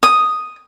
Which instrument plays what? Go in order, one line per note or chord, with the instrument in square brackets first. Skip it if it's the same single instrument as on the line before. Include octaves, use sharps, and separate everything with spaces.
[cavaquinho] D#6